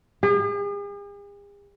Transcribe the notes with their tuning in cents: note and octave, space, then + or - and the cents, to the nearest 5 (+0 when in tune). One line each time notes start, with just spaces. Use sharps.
G#4 -45